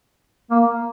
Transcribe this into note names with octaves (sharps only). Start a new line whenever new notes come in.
A#3